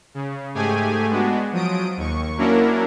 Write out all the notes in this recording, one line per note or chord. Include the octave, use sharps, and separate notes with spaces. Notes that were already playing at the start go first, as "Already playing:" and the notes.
C#3
G#2 A3 G4 G#4 G#5
G#3 B3 D4 F#4
F3 F#3 D#6 D7
D#2 C#6
F#3 A#3 C#4 D4 E4 A#4